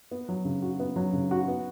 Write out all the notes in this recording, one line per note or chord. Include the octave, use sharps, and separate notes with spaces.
B3
F#3
C#3
F#4
B3
F#3
C#3
F#4
B3